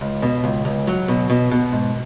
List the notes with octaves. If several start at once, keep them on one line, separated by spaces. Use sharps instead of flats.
C#2
B2
C#2
C#2
F#3
B2
B2
B2
G#2